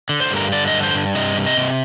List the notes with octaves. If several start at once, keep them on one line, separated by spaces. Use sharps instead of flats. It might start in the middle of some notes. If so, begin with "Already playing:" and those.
D3
C5
G2 A#4
D3 D5
D#5
G2
C5
G2
C3 D#5
C3
D#5
C3